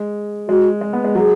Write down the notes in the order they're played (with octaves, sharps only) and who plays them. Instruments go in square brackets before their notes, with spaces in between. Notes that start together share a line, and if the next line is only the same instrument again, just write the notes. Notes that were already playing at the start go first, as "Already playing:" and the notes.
Already playing: [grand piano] G#3
[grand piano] G#3 [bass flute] F#4
[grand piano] G#3
B3
G#3
[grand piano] F#3 [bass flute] G#4